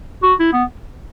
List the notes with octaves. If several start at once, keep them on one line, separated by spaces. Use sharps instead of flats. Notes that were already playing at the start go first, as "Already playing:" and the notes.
F#4
E4
B3